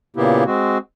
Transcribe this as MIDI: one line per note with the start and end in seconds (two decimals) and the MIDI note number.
0.16 0.44 46
0.16 0.44 49
0.16 0.44 58
0.16 0.44 59
0.16 0.44 64
0.16 0.44 67
0.46 0.78 56
0.46 0.78 60
0.46 0.78 66